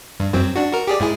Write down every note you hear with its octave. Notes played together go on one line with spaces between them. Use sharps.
G2
F#2 F#3 C4
D4 F#4
F#4 A#4
G4 G#4 D5
G#2 E4 G#4